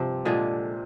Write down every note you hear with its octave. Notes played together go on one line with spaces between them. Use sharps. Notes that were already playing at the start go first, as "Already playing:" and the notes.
Already playing: G2 C3 F3 C4
A#2 D3 G#3 D4 G#4